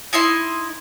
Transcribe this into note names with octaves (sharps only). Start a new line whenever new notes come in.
D#4 E4 D#5 C6